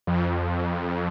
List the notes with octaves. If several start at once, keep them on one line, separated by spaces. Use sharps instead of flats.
F2